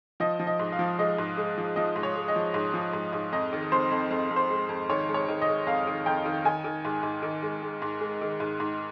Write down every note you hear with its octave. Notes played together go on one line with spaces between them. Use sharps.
F3 D#5
F3
D#5
G#2
F5
F3
G#3 D#5
G#2
G#3
F3
F3 D#5
G#2
C#5
G#3
D#5
F3
G#2
F3
G#2
G#2
F2 D#5
D#3
F2 C5
F2
F2
F2
C5
G#3
F2
D#3 C#5
G#3
C#5
D#3
D#5
G#3
F2 F5
D#3
F2 G5
D#3
D#3 G#5
D#3
G#2
G#2
D#3
G#3
G#3
G#2
G#3
D#3
G#2
G#2